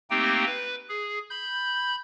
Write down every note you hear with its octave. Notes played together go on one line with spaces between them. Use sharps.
A3 A#3 C4 D#4 G4 G5
B4
G#4
B5 G6